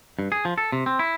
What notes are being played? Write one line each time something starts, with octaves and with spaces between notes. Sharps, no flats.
G2
G#4
F3
A4
C3
C4
E4